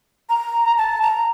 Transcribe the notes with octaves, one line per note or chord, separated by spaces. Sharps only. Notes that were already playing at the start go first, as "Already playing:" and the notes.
A#5
A5
A#5